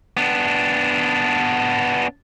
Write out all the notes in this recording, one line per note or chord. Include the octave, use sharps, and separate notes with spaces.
B3 D4